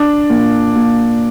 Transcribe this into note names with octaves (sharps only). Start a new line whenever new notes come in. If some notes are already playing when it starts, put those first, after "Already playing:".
Already playing: D4
A#2
A#2